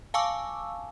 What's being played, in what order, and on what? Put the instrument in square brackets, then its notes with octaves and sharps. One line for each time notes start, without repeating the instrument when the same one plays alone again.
[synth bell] F5 G#5 A5 C#6 D6 E6